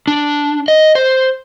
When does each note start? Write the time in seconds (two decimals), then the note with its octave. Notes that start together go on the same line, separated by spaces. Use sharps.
0.08 D4
0.68 D#5
0.95 C5